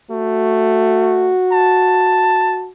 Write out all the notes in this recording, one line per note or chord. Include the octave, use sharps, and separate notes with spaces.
A3 F#4
A5